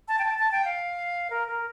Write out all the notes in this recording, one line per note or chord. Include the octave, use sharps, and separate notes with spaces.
A5
G5
A5
A5
G5
F5
A#4
A#4